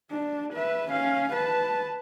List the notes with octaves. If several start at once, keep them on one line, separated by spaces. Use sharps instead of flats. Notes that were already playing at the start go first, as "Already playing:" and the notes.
D4
B4 E5
C#4 F5
B4 A5